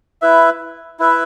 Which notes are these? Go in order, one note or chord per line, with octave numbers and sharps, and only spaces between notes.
E4 B4 E5
E4 B4 E5